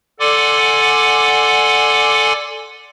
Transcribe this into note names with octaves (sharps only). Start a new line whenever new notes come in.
A4 D5 F#5 G#5 C6 D6